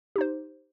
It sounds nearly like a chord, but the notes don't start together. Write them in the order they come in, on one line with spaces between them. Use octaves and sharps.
G4 D#4 C5